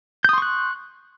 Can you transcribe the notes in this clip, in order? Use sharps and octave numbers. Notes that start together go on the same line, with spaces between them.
C6 C#6 D#6 F#6 G6